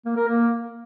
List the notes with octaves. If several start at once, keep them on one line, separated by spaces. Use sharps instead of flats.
A#3
A#4
A#3